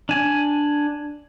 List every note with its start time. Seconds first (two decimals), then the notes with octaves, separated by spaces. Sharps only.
0.09 D4 G#5